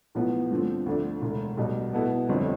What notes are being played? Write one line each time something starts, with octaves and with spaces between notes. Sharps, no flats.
B1 A2 F3 B3
G2 D3 F3 C4
D2 D3 F3 A3 D4
E1 D2 D3
B1 B2 G3
B2 B3 E4 A4
G1 F2 D3 G3 C4